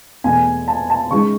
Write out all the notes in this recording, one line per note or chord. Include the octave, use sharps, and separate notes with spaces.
E2 B2 A3 G#5
A5
A5
C#3 G#3 D#4 C#6